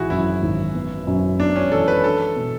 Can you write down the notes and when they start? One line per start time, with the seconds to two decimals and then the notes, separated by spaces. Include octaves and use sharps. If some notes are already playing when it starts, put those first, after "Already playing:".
Already playing: G#1 E3 E4 F#4 G#4
0.10 F#2 E4
0.43 G#1
0.75 B3
1.07 F#2
1.39 B3 D4
1.56 C#4
1.72 E3 A4
1.88 B4
2.04 D4 A4
2.36 B2